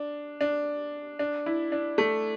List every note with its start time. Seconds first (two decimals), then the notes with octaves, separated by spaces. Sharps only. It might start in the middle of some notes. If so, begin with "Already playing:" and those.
Already playing: D4
0.41 D4
1.19 D4
1.46 E4
1.72 D4
1.98 A3